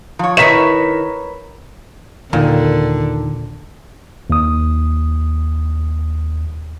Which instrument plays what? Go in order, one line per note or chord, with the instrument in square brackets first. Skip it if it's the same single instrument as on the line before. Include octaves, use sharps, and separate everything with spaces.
[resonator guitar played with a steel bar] F3 C#5
[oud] D#3 E4 [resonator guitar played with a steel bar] A#4 B4 C#5 [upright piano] B6 E7
[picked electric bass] D#2 D#3 [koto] A#2 [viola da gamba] D3
[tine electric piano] D#2 D#6